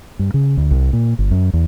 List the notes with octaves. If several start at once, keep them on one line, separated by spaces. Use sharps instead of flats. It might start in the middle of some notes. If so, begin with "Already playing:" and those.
G2
C#3
D2
C2
A#2
G1
F#2
E2